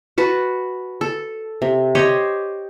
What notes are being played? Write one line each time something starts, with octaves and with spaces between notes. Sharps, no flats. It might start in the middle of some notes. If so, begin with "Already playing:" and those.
F#4 B4 A5
A4
C3
G4 C5 C#5 D#5